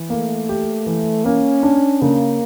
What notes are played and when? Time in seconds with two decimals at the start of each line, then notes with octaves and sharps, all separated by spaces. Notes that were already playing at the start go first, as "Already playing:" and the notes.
Already playing: E3
0.10 A3 A#3
0.49 G4
0.86 E3
1.25 A#3 C#4
1.63 D4
2.02 C#3 A#3